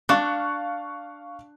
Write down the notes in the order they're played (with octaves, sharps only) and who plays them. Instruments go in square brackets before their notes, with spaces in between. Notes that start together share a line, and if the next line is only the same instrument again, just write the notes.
[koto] D4 [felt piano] F5 C#6 F#6